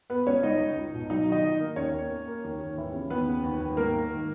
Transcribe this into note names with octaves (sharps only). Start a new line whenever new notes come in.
B3 B4
C#2 C#4 C#5
C#2 D#4 D#5
C#2
C#2
B2
F#3 D#4 D#5
D#3 D#4 D#5
D#3
A#3
D#2 C#4 C#5
A#3
A#3
A#3
D#2
D#2
E3
C#3
D#2 B3 B4
C#3
D#2
D#2
G#2 A#3 A#4
G#2
D#3